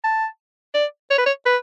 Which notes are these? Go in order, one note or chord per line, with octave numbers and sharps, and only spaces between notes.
A5
D5
C#5
B4
C#5
B4